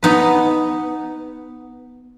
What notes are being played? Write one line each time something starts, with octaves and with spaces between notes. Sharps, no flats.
B3 D#4 B4